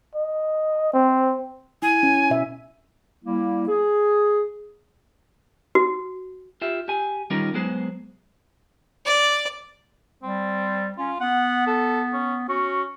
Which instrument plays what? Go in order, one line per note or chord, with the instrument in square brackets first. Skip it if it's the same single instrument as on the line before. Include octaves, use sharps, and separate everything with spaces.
[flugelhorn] D#5
C4
[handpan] E4 [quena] G#5
[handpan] C#4
B2 E5
[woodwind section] G3 A#3 E4
G#4
[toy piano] F#4
[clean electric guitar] F4 G4 E5
G4 G#5
D#3 G3 C#4 D#4 F4 A#4
F#3 G#3 B3 G#4 C5
[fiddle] D5
[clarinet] G3 [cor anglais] C4
[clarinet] C#4 [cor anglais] F4
[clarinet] B3 [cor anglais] F#5
[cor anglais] A4
C#4
[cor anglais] C#4 [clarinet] F#4